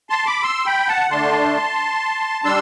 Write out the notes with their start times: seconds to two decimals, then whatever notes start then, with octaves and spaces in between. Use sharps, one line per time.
0.10 A5 C6
0.26 B5 D6
0.43 C6 E6
0.66 G5 B5
0.88 F#5 A5
1.10 D3 A3 D4 A5 C6
2.45 G3 D4 C6 E6